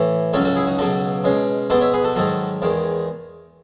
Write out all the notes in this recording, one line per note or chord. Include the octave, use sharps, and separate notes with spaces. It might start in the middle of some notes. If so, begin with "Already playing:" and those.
Already playing: A2 E3 A3
C#2 C#3 F#3 C#4 A4 C#5
F#4 A4
E4 G#4
D#4 F#4
C#2 B2 F#3 F#4 A4
B2 G#3 C#4
B2 G#3 B3 F#4 A4
C#5 E5
G#4 B4
F#4 A4
G#2 D#3 F#3 F#4 A4
E2 D#3 G#3